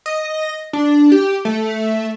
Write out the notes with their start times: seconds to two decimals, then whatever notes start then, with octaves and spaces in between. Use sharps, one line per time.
0.06 D#5
0.73 D4
1.12 G4
1.45 A3